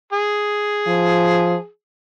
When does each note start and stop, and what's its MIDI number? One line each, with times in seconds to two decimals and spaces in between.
0.13 1.67 68
0.87 1.56 53